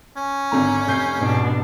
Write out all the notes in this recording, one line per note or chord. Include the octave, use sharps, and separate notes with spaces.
C#4
G#1 D3 A#5
F1 G6 C7
G#2 B2 D4